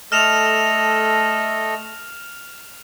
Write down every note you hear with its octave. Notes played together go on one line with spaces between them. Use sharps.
A3 A4 D#5 F6 E7 F7